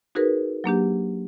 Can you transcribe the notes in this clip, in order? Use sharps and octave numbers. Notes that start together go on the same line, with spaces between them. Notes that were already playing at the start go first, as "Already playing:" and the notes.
D#4 F#4 G#4 A#4 B4
F#3 A#3 D4 G4